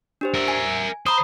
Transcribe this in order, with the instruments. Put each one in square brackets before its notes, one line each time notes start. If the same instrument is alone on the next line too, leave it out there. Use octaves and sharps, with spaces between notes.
[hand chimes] D4 G4 C5
[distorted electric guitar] A#4 E5
[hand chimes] G#5
[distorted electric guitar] C5 [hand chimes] A#5 B5 D#6